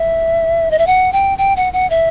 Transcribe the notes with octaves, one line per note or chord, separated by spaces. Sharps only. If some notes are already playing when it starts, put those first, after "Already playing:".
Already playing: E5
D#5
E5
F#5
G5
G5
F#5
F#5
E5